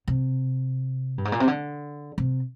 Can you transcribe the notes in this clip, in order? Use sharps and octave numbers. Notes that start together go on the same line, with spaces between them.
C3
G2
G#2
A#2
C3
D3
C3